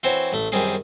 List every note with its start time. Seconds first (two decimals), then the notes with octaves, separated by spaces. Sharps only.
0.03 E3 C4 F#4 C5 C#5
0.33 A1 A3
0.52 F#2 D#3 G3 C4 G#4